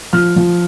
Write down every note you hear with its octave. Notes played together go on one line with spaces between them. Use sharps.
F3 F6
F3